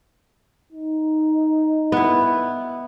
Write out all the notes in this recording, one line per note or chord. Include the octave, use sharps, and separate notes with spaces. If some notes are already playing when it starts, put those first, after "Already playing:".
D#4
B3 E4